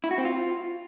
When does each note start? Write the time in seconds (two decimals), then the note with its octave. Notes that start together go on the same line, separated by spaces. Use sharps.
0.04 E4
0.11 F#4
0.18 C4
0.25 F4